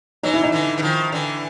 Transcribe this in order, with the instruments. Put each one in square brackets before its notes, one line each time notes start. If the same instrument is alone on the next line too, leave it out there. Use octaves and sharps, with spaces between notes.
[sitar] E3 F#3 [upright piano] D#4
[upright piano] E4
D#4
[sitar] D3 E3
E3
D#3 F3
D3 E3